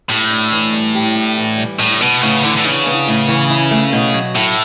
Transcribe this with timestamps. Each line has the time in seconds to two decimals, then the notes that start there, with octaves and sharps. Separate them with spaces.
0.09 A2 G4
0.30 D4
0.52 E3
0.73 G3
0.95 G4
1.16 D4
1.37 E3
1.58 G3
1.79 A2 D4
2.01 B2 B3
2.22 A2 C#3
2.43 D3 E3
2.57 D3
2.65 C#3 D4
2.86 B3
3.07 A2
3.28 E3
3.50 E4
3.71 A3
3.93 B2
4.14 F#3
4.35 A2 E4